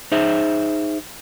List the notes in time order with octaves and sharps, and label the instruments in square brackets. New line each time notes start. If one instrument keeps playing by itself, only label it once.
[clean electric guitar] D#4 G#4 C5 E5